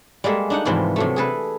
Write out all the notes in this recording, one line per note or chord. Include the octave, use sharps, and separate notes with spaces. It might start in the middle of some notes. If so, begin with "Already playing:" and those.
G3 G#3 A#3 A4 E5
D4 D#4 F#5
G#2 C3 E3 F3 G3
C3 F#3 A3
G#4 A4 B4